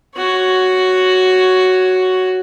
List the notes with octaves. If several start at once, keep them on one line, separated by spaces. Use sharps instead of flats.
F#4 C#5